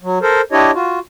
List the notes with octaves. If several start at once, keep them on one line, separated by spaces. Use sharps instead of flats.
F#3
A4 A#4 C5
D4 E4 G4 C#5 D#5
F4 F#4